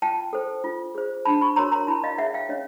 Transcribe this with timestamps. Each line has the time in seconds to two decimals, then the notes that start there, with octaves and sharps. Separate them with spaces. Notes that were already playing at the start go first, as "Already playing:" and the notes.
0.02 F4 G5 A5
0.33 A4 C5
0.64 F4
0.95 G#4 C5
1.25 D4 A5 B5
1.41 B5 C#6
1.56 F#4 A#4 C#5 A#5 C6
1.72 A#5 C6
1.87 E4 A5 B5
2.04 D#5 F5
2.18 G#4 C#5 E5 F#5
2.34 F5 G5
2.49 C#4 C#5 D#5